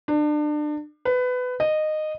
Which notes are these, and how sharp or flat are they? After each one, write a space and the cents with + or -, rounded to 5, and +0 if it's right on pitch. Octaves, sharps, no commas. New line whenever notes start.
D4 +30
B4 +20
D#5 -15